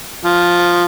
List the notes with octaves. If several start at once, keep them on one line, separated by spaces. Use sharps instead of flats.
F3